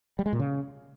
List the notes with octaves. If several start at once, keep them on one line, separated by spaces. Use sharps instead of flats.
G3
G#3
A#2
C#3